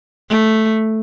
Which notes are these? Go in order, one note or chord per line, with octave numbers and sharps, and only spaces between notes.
A3